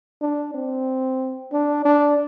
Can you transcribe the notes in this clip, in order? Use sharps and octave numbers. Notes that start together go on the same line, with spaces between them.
D4
C4
D4
D4